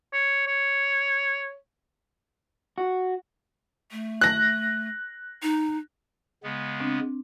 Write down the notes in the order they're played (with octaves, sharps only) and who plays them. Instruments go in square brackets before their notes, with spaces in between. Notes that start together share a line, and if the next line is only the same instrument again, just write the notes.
[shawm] C#5
C#5
[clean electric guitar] F#4
[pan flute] A3
[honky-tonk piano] F#6 A#6
[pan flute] D#4
[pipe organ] C#3 G#3 B3
[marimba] C4 D4